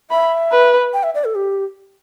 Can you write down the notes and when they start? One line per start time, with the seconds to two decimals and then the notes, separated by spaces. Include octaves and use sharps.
0.11 E5 B5
0.52 B4
0.93 G5
1.03 E5
1.15 D5
1.25 A4
1.35 G4